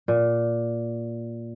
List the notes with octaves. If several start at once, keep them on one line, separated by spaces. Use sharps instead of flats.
A#2